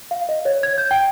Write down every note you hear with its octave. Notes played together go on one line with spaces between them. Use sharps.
F5
D#5
C#5
G#6
G6
G5